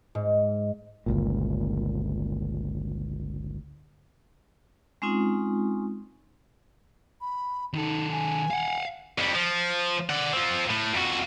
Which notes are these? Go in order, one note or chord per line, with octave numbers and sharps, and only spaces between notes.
G#2
G1 C#2 A#2
G#3 C4 C#4 D#4 F4
B5
D#3 D#4 A4
G#5
F5 F#5
F2 G3
F3
D5 F#5
C4 F4
A2
F2 F#4